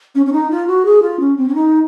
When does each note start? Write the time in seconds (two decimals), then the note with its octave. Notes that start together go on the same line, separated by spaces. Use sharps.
0.15 C#4
0.26 C#4
0.32 D#4
0.50 F4
0.67 F#4
0.85 G#4
1.02 F4
1.19 C#4
1.37 C4
1.48 C#4
1.54 D#4